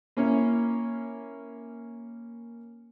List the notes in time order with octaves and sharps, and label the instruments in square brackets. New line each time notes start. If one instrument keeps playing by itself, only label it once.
[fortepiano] A#3 C#4 E4